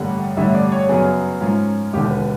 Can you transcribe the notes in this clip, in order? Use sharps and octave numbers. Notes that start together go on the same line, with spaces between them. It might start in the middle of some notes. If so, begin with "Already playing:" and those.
Already playing: A1 G2 D3 G3 A#3 F#5
A1 G2 D3 G3 E5
D5
C#5
F#2 C#3 F#3 B3 G#4
G#2 F3 A#3 C#4
E1 D#2 D3 G4
B4